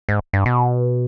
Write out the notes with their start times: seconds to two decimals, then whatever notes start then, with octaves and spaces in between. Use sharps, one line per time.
0.09 G#2
0.33 G2
0.46 B2